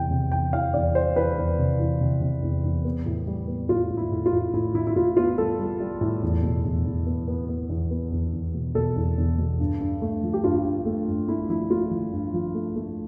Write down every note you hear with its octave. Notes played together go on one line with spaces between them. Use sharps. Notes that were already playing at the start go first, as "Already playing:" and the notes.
Already playing: E2 C3 E3 G5
C3
E2 G5
E3 F5
E2 D5
E3 C5
E3 B4
E2
C3
E3
C3
C3
E2
E2
B3
A2
G3
B3
A2 F4
A2
E4
A2
F4
A2
A2 E4
A2 E4
E4
A2 F4
B3 F4
G3 A4
G3
G3
A2
E2
B2
E2
E2
B3
B3
B3
E2
B3
E2
E2
B2
B2 A4
E2
E2
B2
G2
G2
A3
F3
G4
G2 F4
G2
A3
G2
A3 E4
F3 E4
A3 F4
F3
G2
F3
A3
A3